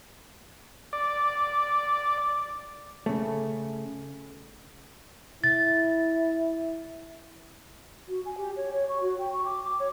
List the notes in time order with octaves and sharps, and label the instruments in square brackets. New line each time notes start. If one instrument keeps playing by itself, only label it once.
[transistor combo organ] D5
[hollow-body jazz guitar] C#3 A3
[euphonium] E4 [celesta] A6
[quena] F#4
G#5
G4
C#5
C#5
C#6
F#4
G5
C#6
D6
D6
C#5